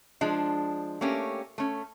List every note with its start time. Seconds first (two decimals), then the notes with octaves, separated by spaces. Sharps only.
0.21 F3 G#3 D4
1.01 A3 A#3 C#4 G4
1.58 A3 C#4